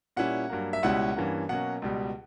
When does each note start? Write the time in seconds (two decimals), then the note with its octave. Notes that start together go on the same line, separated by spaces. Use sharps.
0.17 A#2 G3 C#4 E4 F#5
0.50 G2 F#3 A#3
0.73 E5
0.83 C#2 B2 G3 C#4 E4 F#5
1.16 G2 E3 A#3 C#4
1.49 B2 F#3 A#3 C#4 F#5
1.82 C#2 B2 G3